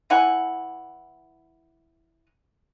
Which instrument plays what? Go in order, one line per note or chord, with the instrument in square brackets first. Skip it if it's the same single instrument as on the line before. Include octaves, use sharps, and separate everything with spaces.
[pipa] E3 E4 F#5 G#5